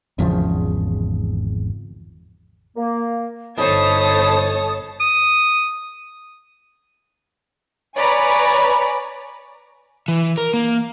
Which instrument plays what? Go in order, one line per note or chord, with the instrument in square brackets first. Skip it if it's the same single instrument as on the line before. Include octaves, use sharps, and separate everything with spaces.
[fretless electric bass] G#1 E2 C#3 F3
[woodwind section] A#3
[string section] G1 A4 A5 [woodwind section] D#4 C5 B5 [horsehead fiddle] C#5 [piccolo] D#6
[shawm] D#6
[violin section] B4 C#5 D5 G#5 A#5 B5
[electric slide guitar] E3
A#4
A#3